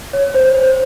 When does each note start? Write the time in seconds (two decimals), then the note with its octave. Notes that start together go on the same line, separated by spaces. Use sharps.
0.13 C#5
0.34 C5
0.54 C5